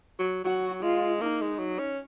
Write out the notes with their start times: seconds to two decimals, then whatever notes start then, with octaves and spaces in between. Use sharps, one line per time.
0.19 F#3
0.44 F#3 F#4
0.83 G#3 F4
1.21 A#3 D#4
1.41 G#3
1.59 F#3
1.79 C#4